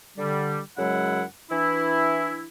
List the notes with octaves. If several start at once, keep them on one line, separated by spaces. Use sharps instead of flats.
D3 G3
F#2 C#3 F#3 G#3 E4 F#5
E3 D4 E4